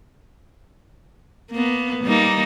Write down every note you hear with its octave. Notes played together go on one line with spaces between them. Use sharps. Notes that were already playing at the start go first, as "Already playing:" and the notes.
A#3 B3
G3 A#3 D#4